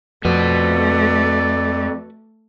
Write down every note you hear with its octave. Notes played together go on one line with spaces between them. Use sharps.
F2 A3 F#4 B4 D5